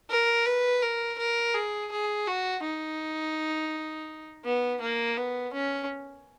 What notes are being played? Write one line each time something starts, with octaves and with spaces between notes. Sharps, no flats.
A#4
B4
A#4
A#4
G#4
G#4
F#4
D#4
B3
A#3
B3
C#4